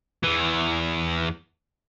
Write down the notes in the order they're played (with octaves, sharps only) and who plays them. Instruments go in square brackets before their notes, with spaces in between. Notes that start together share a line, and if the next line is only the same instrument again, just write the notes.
[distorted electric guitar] E2 E3